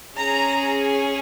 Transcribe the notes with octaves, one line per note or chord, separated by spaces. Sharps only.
C#4 G#4 A#5